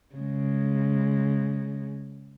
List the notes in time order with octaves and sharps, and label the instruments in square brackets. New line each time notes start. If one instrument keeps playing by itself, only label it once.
[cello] C#3 G#3